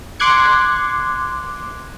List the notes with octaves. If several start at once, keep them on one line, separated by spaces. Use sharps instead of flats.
C6 D6 F#6 G#6 C#7